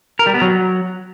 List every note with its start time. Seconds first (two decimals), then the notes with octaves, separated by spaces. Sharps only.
0.19 A#4
0.27 G3
0.34 B3
0.42 F#3